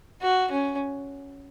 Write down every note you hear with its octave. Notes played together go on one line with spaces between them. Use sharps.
F#4
C#4